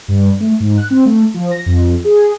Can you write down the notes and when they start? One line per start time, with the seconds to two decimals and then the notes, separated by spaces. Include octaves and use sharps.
0.08 G2
0.40 A3
0.60 G#2
0.78 F#6
0.91 C4
1.05 A3
1.34 F3
1.51 A#6
1.66 F2
2.04 G#4